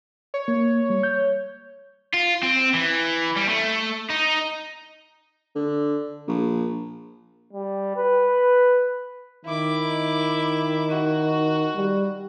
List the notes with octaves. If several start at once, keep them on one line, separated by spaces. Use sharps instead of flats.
C#5
A#3
G3
G6
F4
C4
E3
G3
A3
D#4
D3
A#1
G3
B4
D#3 E4 D6
F#4
G3